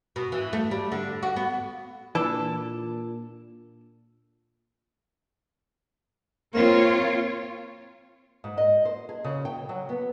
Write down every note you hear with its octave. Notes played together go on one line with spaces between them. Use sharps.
B2
E3
A3
G3
D3
F#4
B3
A#2 E3 D4 A4
A#3 C4 F4 C#5
G#2
D#5
C5
G#4
C#3
G5
F#3
B3